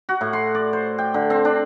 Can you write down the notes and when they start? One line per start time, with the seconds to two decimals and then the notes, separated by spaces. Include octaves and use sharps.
0.09 F#4
0.21 A2
0.33 C6
0.55 D5
0.73 C5
0.98 G5
1.14 D3
1.30 C4
1.45 D4